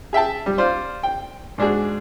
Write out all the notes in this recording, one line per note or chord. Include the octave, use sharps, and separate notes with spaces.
G#4 E5 G5 A5
G3
F4 C5 D5
G5
G#2 D4 F#4 G#4